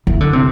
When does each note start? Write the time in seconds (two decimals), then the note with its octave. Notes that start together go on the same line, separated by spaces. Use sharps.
0.07 E3
0.20 D3
0.33 C3